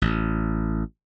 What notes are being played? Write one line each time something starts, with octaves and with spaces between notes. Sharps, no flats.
A1